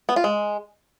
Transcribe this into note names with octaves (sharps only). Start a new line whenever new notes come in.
B3
F4
G#3